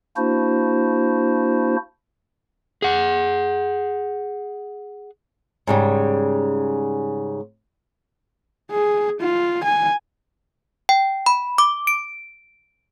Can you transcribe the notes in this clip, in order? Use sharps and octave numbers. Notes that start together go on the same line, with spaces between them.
A#3 D4 E4 F#4 C5
G#4 F#5
G#2 C#3 G3
G#4
F4
G#5
G5
B5
D6
D7